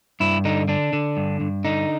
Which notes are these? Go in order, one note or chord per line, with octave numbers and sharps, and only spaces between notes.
G2 E4
D3 D#4
D3 D4
D3
G2
G2
D3 D#4